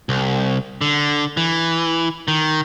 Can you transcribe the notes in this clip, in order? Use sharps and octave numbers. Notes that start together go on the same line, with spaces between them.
C2
D3
E3
D#3